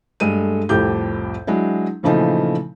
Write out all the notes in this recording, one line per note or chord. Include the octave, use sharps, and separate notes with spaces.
G2 G#3 A3 A4 D#7
C2 F2 A2 G4 A4 G6
F#3 G#3 D4 E4
A#2 C#3 E3 F3 A3 D#4